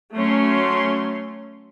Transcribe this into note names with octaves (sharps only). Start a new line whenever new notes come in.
F#3 A3 C#4 C6